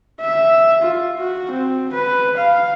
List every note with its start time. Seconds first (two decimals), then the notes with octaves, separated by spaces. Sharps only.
0.21 E5
0.82 F4
1.19 F#4
1.51 C4
1.93 B4
2.37 F5